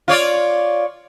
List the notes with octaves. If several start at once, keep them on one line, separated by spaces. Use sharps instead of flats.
F4 C#5 D5